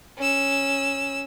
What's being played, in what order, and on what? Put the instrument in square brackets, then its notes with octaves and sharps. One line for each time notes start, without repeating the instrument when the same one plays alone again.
[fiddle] C#4 E6